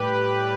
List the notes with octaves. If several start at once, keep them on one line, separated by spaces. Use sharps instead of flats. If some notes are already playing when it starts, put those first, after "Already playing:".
Already playing: A2 G3 G4 B4